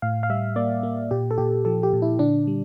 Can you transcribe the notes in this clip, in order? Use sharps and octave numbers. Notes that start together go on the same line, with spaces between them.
A2 F5
F5
G3 E5
A#3 D5
A#3
A#2 G4
A4
A#2 G4
F3 A4
G4
A#2
E4
D3 D4
G3